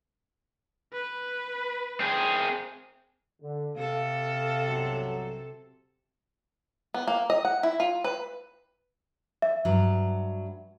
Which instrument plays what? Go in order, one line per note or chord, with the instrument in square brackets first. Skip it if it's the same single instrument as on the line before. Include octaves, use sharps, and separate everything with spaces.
[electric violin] B4
[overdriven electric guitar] C4 G#4
[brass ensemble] D3
[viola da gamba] C3 A4 [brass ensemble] F5
[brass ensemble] B1 G2 F#3
[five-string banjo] B3
A#3
D#5
F#5
E4
F4
B4
[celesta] E5
[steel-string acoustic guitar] G2 F#3